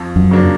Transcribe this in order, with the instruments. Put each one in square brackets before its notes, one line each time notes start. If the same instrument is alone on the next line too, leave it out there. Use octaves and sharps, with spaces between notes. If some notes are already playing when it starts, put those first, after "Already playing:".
Already playing: [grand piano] F2
[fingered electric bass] F#2
[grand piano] C#3 F#3 A#3 D4